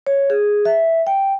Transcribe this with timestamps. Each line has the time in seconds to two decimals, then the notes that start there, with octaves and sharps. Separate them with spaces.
0.07 C#5
0.30 G#4
0.65 E5
1.07 G5